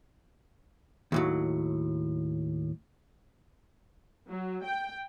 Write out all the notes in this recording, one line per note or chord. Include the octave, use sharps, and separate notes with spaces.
D#2 A2 F#3
F#3
G5